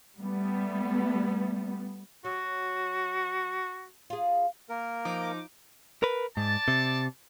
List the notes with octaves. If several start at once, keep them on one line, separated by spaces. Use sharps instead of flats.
G3 A3 B3
F#3 F#4
F4 G#4
A#3 A#4
F3 D#4 D6
A#4 B4
G#2 D5 A5
C3